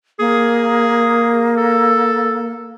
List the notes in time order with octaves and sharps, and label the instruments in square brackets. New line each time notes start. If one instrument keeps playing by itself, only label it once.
[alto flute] A#3 [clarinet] G#4
[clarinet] A4